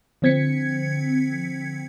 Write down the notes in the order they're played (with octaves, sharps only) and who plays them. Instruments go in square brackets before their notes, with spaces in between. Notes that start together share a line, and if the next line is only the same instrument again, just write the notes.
[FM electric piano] D3 F3 C4 G#6 B6 C#7